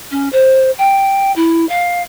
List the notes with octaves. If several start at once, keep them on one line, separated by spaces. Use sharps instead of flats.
C#4
C5
G5
E4
F5